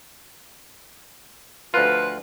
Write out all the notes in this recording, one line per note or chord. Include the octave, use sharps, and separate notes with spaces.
D2 F3 F4 B4